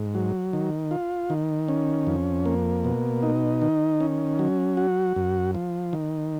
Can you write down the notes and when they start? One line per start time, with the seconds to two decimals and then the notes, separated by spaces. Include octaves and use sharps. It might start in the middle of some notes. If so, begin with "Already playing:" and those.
Already playing: G#2
0.14 F#3
0.53 D#3
0.91 F4
1.30 D#3
1.68 C#4
2.07 F2
2.45 A#3
2.84 B2
3.23 D#4
3.62 D#3
4.00 C#4
4.39 F#3
4.77 F#4
5.16 F#2
5.55 F3
5.93 D#3